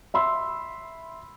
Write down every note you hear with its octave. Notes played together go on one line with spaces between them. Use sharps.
E5 B5 C6 E6